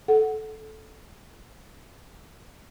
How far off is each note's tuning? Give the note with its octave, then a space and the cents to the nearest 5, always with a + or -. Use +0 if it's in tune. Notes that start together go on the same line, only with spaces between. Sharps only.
A4 -15 F#5 +0